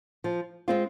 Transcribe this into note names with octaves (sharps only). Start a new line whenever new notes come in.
F3
G#3 C4 F4